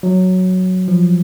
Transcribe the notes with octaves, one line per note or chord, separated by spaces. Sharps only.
F#3
F3